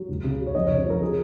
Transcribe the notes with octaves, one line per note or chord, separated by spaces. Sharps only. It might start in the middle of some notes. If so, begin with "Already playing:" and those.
Already playing: F#3
C#2
C#3
F#3
C#5
F2 D#5
C#5
C#3
C#5
F3 A#4
G#4